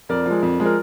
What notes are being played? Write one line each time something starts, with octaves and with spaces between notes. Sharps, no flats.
F2 A#4 D5
F3 G#3
F2
F3 G#3
A#4